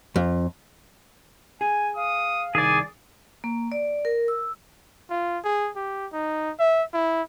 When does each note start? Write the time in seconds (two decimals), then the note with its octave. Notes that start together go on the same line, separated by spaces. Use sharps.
0.16 F2
1.61 G#4 G#5
1.97 F5 D#6
2.55 C2 D#3 G#4 D5 G#5
3.44 A#3
3.72 D5
4.05 A#4
4.28 E6
5.10 F4
5.45 G#4
5.76 G4
6.13 D#4
6.59 E5
6.93 E4